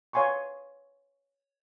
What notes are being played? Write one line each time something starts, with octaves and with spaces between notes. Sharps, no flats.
B4 C#5 F5 G#5 C6 C#6